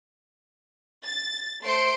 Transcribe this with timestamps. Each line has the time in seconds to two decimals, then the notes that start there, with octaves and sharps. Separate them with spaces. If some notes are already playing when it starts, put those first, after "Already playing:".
1.05 A6
1.63 A3 C5 C6 C#7 D7